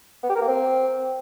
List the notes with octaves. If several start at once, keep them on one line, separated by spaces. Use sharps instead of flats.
B3
G4
A#4
A#3
C4